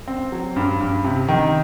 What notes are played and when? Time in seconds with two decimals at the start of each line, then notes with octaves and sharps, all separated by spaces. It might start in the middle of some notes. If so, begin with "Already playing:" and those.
0.08 C4
0.32 F#3
0.56 G2
0.81 G2
1.04 C3
1.28 D#3